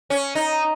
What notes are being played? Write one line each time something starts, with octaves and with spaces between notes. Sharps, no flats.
C#4
D#4